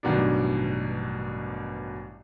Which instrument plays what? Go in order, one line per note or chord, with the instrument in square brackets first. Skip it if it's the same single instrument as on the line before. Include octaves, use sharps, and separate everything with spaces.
[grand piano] A1 G2 B2 D#3 F#3 D4